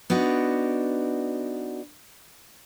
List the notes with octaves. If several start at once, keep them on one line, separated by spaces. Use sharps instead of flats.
B3 D4 D#4 F#4